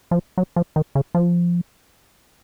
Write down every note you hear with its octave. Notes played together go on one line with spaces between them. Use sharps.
F3
F#3
F3
D#3
C#3
F3